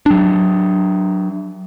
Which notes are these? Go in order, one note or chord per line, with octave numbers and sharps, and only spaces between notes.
F#3 D4